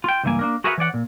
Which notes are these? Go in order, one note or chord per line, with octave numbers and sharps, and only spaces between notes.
F4 G5
C#2 G2 E3 A3 A#3 G#5
A#3 D4 A#4
F#4 G#4 A#4 B4 E5 F#5
E3 C#5 D5 F#5
A#2